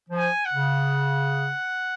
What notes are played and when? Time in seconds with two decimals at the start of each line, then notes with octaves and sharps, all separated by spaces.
0.09 F3
0.16 G#5
0.45 F#5
0.53 C#3